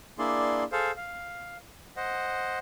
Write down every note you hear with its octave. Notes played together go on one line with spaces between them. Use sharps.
A#3 D4 E4 G#4 D5 C6
G#4 A4 C5 F5
F5
C5 D#5 F#5